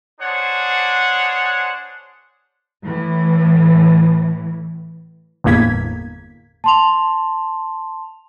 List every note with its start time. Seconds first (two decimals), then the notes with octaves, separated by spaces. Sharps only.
0.21 D4 G#4 C5 C#5 F#5
2.84 A2 E3
5.44 G1 E2 A2 A#3 G#6 B6
6.64 A5 C6 F7